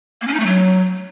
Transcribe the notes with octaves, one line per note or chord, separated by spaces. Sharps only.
A#3
C#4
D#4
A3
F#3